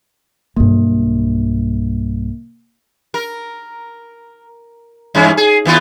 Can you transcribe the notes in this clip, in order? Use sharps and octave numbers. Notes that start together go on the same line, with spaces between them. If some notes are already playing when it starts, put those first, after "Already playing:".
B1 G2 A#3
A#4
G2 E3 C#4
G#4
D#2 B3 F4